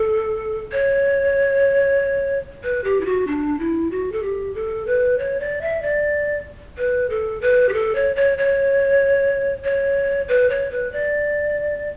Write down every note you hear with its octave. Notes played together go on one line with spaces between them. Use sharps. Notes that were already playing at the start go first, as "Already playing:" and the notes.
Already playing: A4
C#5
B4
G4
E4
F#4
D4
E4
F#4
A4
G4
A4
B4
C#5
D5
E5
D5
B4
A4
B4
G4
A4
C#5
C#5
C#5
C#5
B4
C#5
B4
D5